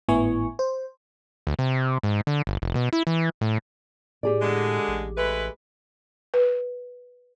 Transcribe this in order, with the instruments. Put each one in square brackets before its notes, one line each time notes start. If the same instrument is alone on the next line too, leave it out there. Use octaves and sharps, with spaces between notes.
[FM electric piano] G#1 A2 B3 E4 G#5 C#6
C5
[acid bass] D2
C3
G#2
D3
G1
F1
B2
E4
E3
A2
[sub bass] A2 [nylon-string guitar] G4 G#4 D5
[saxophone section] D3 G#3
[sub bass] A1
[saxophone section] G#3 A3 B4
[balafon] B4